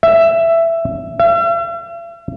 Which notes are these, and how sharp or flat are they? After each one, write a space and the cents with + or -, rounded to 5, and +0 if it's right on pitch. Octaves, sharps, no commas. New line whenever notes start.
E5 +10
E5 +45